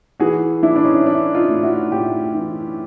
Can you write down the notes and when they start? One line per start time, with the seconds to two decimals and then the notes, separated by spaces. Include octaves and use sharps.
0.19 E3 F#4 G#4
0.63 E3 D4 E4
0.76 D4
0.85 C#4 D#4
1.06 E3 D4 E4
1.35 D#4 F4
1.49 A2
1.63 E4 F#4
1.91 A2 F4 G4
2.35 E3